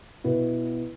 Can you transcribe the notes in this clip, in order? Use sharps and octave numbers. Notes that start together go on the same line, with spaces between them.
B2 B3 E4 B4